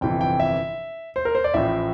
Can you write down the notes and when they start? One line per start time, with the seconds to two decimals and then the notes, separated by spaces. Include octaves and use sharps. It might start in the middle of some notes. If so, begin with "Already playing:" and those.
0.01 G1 F2 C3 E3 G5
0.21 G5
0.40 E5
1.16 C5
1.25 A#4
1.35 C5
1.44 D5
1.54 A1 A2 F3 E5